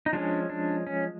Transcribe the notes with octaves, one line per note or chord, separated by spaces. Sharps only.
D#4
F3 G#3 C#4 D4
D4
C#4